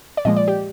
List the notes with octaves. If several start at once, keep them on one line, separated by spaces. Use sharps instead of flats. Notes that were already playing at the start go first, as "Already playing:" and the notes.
D5
A#2 F3 G#3 D#5
D5
G4